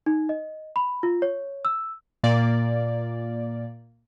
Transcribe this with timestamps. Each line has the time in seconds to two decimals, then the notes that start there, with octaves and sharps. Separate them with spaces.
0.06 D#4
0.29 D#5
0.76 B5
1.03 F4
1.22 C#5
1.65 E6
2.23 A#2 A#3 D5